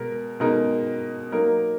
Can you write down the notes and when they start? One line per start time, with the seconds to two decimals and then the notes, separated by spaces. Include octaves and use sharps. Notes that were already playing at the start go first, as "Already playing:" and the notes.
Already playing: B2 G#3 A#4
0.40 B2 G#3 D#4 A#4
1.32 F#3 A#3 D#4 A#4